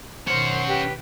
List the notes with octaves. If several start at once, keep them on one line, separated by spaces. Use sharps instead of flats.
B2 D#3 C#4 C5 F#5
G4 B4